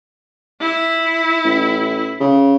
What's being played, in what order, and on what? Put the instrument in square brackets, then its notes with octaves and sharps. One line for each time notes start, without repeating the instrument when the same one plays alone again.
[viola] E4
[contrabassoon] A1
C#3